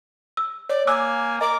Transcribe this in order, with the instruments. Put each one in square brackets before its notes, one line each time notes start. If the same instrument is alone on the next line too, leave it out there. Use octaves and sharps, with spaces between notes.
[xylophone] E6
[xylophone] C#5 [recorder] D5
[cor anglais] A#3 [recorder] G#5 [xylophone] D6 E6 F#6
[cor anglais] A#4 [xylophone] D#5 [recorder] D6